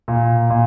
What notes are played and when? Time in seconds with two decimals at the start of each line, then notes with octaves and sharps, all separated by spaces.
0.08 A#2
0.50 A#2